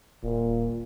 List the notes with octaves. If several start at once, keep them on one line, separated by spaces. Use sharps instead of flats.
D#1 A#2